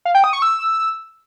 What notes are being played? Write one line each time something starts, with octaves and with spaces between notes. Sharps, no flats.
F5
G5
D#6
C#6
E6